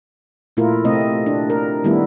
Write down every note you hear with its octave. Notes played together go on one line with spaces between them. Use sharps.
A#2 A3 E4 F4 A#4
C3 A3 C4 D#5
D4
A#4
D#3 G3 A3 B3 E4